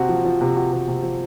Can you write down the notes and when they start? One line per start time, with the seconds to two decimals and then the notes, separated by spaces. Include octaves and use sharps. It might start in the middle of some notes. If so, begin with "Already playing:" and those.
Already playing: C3 C4 F#4
0.09 F3
0.25 F3
0.41 C3
0.55 F#4
0.72 C3
0.88 C3
1.03 F3